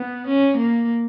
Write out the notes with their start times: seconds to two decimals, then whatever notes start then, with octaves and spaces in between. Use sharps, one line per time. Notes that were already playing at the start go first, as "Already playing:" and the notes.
Already playing: B3
0.27 C#4
0.57 A#3